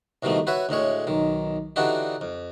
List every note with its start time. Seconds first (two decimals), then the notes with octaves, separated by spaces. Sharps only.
0.23 C2 B2 D#3 F3 A3
0.47 F#4 B4 C#5 E5
0.69 D2 A2 G#3 C#5
1.07 B1 D#3
1.76 D3 E3 D4 D#4 F#4 G4
2.21 F2